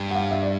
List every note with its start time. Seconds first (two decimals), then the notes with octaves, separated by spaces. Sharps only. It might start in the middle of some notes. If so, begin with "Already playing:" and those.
Already playing: G2
0.11 F#5
0.15 F5
0.31 E5
0.43 D5